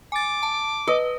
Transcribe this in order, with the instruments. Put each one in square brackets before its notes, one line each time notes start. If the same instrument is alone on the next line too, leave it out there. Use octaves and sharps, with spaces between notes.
[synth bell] G#5 A6 [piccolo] D6
[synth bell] A5
[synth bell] B4 [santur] D#5